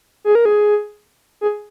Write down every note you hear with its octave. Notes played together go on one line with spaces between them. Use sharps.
G#4
A#4
G#4
G#4